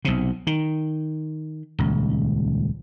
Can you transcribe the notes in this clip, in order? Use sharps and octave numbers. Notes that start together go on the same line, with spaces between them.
B1 C3
D#3
D#1 C#2